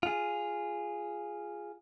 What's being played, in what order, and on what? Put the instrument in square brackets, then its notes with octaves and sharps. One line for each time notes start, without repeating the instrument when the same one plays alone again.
[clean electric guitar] F4 G#4